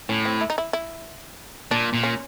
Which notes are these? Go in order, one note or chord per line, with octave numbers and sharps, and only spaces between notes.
A2 C#4
C4
E4
D#4
E4
E4
A#2 D4
A#2
C#4